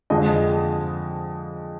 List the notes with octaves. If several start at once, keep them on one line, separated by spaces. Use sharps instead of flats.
F2 D3 F3 G#3 D#5